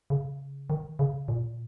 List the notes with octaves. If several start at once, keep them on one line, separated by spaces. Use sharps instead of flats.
C#3
D#3
C#3
A#2